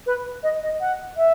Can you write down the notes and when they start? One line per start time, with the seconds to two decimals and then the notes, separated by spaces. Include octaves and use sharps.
0.06 B4
0.43 D#5
0.63 D#5
0.80 F#5
1.17 E5